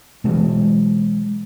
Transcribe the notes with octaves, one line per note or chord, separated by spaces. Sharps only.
B2 E3 F#3 G#3